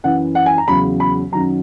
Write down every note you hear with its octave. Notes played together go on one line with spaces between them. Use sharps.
F#2 E3 F#5
F#5
G#5
A#5
E2 C#3 F#3 B5
B5
F#2 D#3 F#3 A#5